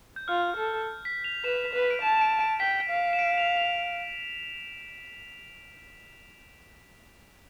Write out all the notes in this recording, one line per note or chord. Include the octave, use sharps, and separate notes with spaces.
G6
F4 F6
A4
B6
F7
B4 E7
B4
D7
A5 E7
D7
D7
G5 B6
F5
E7
D7
F7
F7